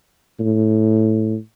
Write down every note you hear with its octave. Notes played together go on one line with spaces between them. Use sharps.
A2